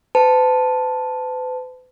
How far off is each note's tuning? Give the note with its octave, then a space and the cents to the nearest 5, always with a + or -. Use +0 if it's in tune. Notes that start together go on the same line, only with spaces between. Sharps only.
B4 +45 A5 +0